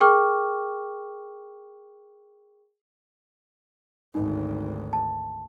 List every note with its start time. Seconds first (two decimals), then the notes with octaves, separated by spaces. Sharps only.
0.01 G#4 A#4 G5 C#6 D6 F6
4.15 G#1 D2 D#4
4.93 A5